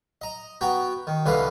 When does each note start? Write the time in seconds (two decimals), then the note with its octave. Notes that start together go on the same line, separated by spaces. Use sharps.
0.21 D#5 A#5
0.61 B3 F#4 G5 A#5
1.07 D#3
1.26 C2 D3 E3 B4 D#5 F5